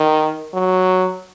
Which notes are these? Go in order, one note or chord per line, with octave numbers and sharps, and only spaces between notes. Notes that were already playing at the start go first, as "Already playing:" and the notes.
Already playing: D#3
F#3